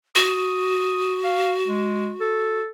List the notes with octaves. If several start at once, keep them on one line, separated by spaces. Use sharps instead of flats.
F#4 D#6
F5
G#3
A4